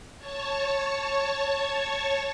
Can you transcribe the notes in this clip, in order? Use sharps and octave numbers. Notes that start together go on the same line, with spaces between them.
C#5 A5 C#6